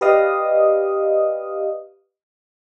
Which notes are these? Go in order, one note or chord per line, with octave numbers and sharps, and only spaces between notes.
G4 B4 D5 D#5 F5 D#6